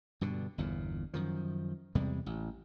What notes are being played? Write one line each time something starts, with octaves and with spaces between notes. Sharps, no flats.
G2 B2 D3
G1 E2 A#2
F#2 D#3 F3
E2 C3 G3 G#3
A1